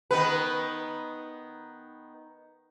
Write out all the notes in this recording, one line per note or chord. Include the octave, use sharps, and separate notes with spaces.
D#3 B3 B4